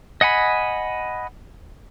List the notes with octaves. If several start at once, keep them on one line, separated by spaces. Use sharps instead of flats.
D#5 F#5 G#5 B5